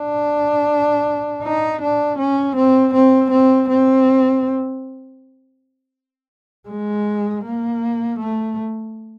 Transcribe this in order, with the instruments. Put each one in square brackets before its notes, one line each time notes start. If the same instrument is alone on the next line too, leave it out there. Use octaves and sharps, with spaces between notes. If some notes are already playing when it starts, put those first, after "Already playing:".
Already playing: [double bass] D4
D#4
D4
C#4
C4
C4
C4
C4
G#3
A#3
A3